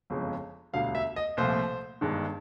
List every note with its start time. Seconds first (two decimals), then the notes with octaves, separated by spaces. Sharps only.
0.10 G1 F2 C#3 F3 G#3
0.73 E1 D2 D3 G3 F5
0.95 E5
1.16 D#5
1.37 C2 A#2 F3 A3 C5
2.01 G1 G2 D#3 G#3